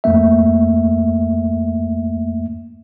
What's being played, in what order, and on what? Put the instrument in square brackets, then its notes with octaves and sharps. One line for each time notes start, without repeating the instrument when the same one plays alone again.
[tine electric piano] F2 A3 A#3 E5